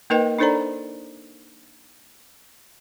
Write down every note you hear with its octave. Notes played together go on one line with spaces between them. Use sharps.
A#3 D#4 A#4 B4 D#5 G5
D4 D#4 A4 C5 D5 A#5